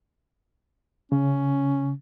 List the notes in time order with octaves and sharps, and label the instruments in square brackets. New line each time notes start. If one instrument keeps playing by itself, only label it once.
[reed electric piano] C#3 [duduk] C#4